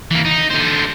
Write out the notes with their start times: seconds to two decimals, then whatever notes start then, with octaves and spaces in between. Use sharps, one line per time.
0.11 E3 A#3
0.25 D#4
0.50 D3 C5